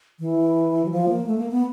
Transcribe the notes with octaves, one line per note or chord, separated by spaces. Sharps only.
E3
F#3
F3
A#3
A3
A#3
B3